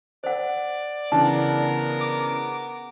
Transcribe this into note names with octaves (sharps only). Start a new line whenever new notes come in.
C5 D5 F#5
C#3 E3 B3 D4 A#4 A5
D6